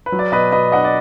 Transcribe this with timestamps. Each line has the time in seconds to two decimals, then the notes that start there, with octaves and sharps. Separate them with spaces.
0.06 B4
0.12 F#3
0.19 D5
0.32 B2 B4 D#5
0.52 B2 B4 D#5
0.72 D4 D#5 F#5
0.84 D5